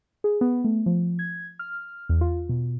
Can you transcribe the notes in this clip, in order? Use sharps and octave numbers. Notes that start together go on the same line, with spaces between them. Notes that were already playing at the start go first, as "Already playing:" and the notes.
G#4
B3
A3
F3
G#6
F6
E2
F4
B2